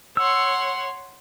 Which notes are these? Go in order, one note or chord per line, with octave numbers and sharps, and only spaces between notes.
C#5 F#5 C6 E6